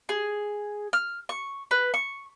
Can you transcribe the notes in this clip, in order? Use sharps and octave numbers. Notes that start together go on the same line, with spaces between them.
G#4
F6
C#6
B4
C#6